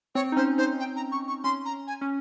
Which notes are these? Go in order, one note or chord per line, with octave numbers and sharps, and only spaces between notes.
C4 C#5
D#4
C#4 C5
D#4 C5
G5
A#5
C#6
C#6
C#4 C6
A#5
G#5
C#4